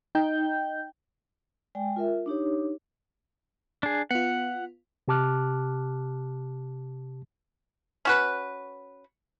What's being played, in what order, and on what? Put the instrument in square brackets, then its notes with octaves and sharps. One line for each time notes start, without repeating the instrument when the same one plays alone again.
[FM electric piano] D#4 G5 G6
[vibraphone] G#3 D5 G5 G#5
F4 A#4 E5
D4 D#4 G4 C#5
[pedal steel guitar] D4 G#4
[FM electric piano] B3 F4 [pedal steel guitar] F#5
[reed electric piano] C3 G4 A5 D6 F6 F#6
[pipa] C#4 F#4 B4